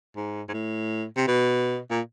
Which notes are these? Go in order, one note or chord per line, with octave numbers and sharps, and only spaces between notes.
G#2
G#2
A2
C3
B2
A#2